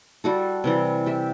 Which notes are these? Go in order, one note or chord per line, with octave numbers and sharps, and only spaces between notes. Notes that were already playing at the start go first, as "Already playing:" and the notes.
G3 F#4 A4
C3 E3 G3
G4 E5